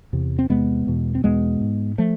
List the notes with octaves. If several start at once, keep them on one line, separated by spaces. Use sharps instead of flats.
E2 C3
C4
E2 C3 G#3 B3
E2 B2
C4
E2 B2 G#3 B3
G#2
F3 A3